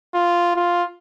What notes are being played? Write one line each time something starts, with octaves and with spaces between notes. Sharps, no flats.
F4
F4